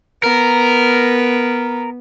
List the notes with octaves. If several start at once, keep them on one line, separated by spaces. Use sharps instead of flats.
B3 A#4